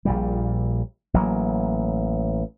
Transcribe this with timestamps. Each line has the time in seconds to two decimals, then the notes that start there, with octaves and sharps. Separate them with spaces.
0.05 A#1 A#2 G3
1.14 A1 F#3 A#3